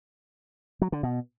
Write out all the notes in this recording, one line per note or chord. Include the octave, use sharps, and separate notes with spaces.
F#3
D3
B2